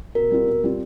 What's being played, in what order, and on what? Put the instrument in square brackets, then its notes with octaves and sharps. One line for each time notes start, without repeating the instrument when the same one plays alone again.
[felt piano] B2 [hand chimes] A#4
[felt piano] G3 C4 F4
B2
G3 C4 F4